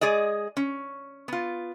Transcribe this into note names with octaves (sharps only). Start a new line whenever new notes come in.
G#3 G#4 D5 D#5
C#4
B3 F4